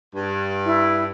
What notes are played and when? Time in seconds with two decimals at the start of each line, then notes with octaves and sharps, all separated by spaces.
0.14 G2
0.65 E4